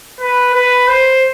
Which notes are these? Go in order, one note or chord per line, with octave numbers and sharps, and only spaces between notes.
B4
B4
C5